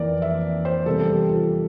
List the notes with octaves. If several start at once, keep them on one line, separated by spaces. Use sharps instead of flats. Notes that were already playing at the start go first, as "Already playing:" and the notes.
Already playing: F2 E3 A#3 A#4 D5
E5
C5
E2 C3 G3 A4
A4
G4
F4